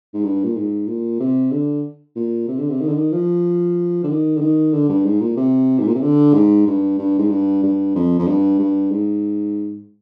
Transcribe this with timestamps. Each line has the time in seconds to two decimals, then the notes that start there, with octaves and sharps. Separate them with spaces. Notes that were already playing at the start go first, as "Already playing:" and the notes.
0.14 G#2
0.24 G2
0.44 A#2
0.57 G#2
0.88 A#2
1.20 C3
1.52 D3
2.16 A#2
2.48 C3
2.59 D3
2.70 C3
2.81 D#3
2.88 D3
2.94 D#3
3.12 F3
4.04 D3
4.10 D#3
4.37 D3
4.41 D#3
4.73 D3
4.89 G2
5.05 G#2
5.21 A#2
5.37 C3
5.79 G#2
5.87 A#2
5.95 C3
6.03 D3
6.34 G#2
6.67 G2
6.99 G2
7.18 G#2
7.30 G2
7.63 G2
7.95 F2
8.19 F2
8.28 G2
8.59 G2
8.91 G#2